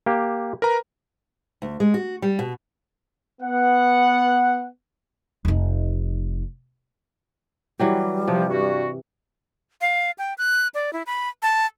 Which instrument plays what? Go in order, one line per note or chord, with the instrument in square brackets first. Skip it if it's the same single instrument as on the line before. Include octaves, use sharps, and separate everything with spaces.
[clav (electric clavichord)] A#3 G4
[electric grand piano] A#4 B4 A#5
[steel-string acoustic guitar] D2
G#3
F#4
G3
B2
[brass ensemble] B3 F#5
[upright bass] F1 D#4
[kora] E3 F#3 G4 [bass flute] G3
[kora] C3 [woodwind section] F3
[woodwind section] G2 F#4
[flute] F5
G5
F#6
D5
E4
B5
A5